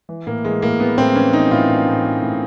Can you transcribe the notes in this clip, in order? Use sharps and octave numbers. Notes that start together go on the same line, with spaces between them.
E3
A2 A#3
E3 G#3
A2 A#3
E3 B3
A2 C4
E3 C#4
E3 D#4
A2 F4
A2
A2
E3
A2